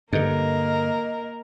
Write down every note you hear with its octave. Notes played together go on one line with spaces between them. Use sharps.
G2 D3 A#3 A#4 D#5